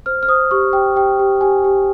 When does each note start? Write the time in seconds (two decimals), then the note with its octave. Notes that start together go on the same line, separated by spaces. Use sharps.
0.06 C5 F6
0.23 F6
0.28 C5 D#6
0.51 G4 C#6
0.73 G4 G5
0.96 G4 G5
1.19 G4
1.41 G4 G#5
1.64 G4